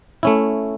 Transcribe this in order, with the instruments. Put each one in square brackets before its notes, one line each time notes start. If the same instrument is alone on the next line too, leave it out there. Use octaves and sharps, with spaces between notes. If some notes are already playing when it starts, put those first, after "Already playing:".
[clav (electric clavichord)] A3 C#4 E4